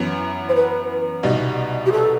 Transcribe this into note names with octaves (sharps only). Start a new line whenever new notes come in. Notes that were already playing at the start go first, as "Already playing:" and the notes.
Already playing: F#2 E3 B3
C5
B4
C2 B2 G3 B3 D#4
G4
A4